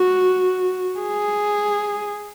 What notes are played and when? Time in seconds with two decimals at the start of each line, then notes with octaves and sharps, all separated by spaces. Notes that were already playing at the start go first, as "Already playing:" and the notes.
Already playing: F#4
1.00 G#4